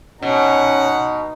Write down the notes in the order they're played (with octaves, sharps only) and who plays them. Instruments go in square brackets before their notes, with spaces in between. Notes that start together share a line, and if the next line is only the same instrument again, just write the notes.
[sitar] B2 [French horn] C#4 [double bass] D#4 [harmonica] F#5